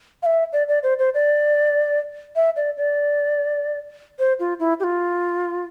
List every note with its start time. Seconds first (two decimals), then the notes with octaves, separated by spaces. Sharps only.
0.23 F5
0.26 E5
0.53 D5
0.68 D5
0.83 C5
0.99 C5
1.14 D5
2.36 E5
2.56 D5
2.77 D5
4.19 C5
4.40 F4
4.59 E4
4.80 G4
4.84 F4